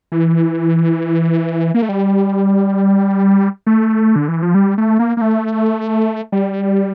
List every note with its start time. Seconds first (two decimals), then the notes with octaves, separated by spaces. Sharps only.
0.12 E3
1.74 A#3
1.82 A3
1.89 G3
3.67 A3
4.16 D3
4.28 E3
4.42 F3
4.55 G3
4.78 A3
4.99 A#3
5.17 A#3
5.21 A3
6.32 G3